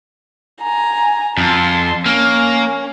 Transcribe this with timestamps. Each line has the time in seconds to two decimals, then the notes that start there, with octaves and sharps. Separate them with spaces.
0.62 G#5 A#5
1.38 F2 A5 C6
2.06 A#3 C#4